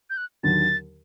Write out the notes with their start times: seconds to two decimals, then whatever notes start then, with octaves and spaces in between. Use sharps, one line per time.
0.10 G6
0.17 F#6
0.43 D#2 D3 F#3 A6